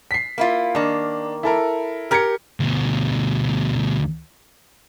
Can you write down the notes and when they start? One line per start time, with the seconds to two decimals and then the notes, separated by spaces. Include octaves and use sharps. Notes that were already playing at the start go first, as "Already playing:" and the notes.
0.11 B6 C7
0.38 A#3 E4 F4
0.75 D#3 A#3 D4
1.43 E4 A4 A#4
2.11 G4 A#4 F6 G#6 C#7
2.60 D2 B2